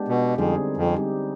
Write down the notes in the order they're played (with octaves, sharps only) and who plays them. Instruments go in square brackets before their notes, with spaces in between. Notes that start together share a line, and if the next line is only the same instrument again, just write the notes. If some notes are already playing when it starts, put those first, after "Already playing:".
Already playing: [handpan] G#3 B3 D4 G4
[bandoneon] B2
[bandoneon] F2 [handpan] D3 G3 C4 D#4 G#4
[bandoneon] F2
[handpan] G3 C4 D#4 G4